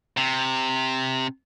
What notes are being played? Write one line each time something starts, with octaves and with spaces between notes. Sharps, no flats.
C3